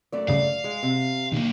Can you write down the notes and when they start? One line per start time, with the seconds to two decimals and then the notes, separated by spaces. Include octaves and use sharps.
0.12 F#2 A3 D5
0.29 G2 C#3 F5
0.64 G#3
0.83 C3
1.32 B1 D#3 A#3